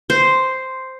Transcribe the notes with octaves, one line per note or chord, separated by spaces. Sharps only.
C5